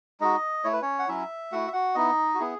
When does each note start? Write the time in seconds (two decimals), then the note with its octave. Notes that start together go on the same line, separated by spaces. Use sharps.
0.20 G#3 D#4 F#4 D#5
0.64 A3 E4 C#5
0.73 B4
0.82 C#4 C#5
0.99 F#5
1.08 F#3 C#4 E4 E5
1.52 A3 E4 F#4 F#5
1.68 E5
1.73 F#4 F#5
1.95 B3 D#4 E4 D#5
2.35 F#4
2.39 B3 E4 G#4